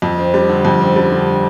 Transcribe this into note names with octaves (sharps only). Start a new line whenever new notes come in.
F2
C4
G3
D3
F2
C4
G3
D3